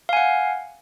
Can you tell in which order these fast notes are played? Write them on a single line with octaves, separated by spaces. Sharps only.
F5 G#5 F#5